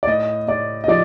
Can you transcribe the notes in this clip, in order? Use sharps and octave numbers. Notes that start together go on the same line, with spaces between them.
D5
A2 D#5
A2 D5
D#5
F3 D5